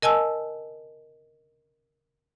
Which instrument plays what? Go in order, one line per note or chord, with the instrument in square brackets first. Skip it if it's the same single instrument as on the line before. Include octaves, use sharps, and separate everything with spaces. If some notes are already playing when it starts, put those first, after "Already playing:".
[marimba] A#4 D#5 G#5 A5 E6